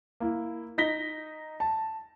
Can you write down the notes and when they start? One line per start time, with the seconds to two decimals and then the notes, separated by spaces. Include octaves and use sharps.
0.20 A#3 E4
0.78 D#4 A#6 B6 G7
1.60 A5